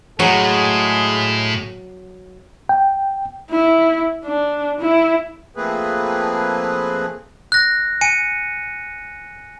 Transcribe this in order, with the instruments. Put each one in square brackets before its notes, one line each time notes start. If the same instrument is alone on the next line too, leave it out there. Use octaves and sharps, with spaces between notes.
[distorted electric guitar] A2 [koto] F#3 [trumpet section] G#3 G#4
[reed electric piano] G5
[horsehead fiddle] E4
D4
E4
[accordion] F3 A3 A#3 C4 G#4 B4
[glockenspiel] F#6 A#6
G#5 C#7 D#7